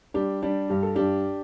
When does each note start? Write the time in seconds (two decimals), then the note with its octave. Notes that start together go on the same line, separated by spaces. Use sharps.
0.14 G3 D4 G4
0.42 G3 D4 G4
0.70 G2 G4
0.83 A4
0.95 G2 D4 G4